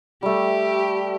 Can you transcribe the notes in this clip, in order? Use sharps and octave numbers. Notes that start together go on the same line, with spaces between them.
G3 A3 G4